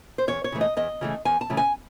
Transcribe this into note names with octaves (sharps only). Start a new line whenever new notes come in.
C5
E2 C#5
C#5
C#3 E3 A3
D#5
E2 D#5
C#3 E3 A3
E2 G#5
A5
C#3 E3 A3
G#5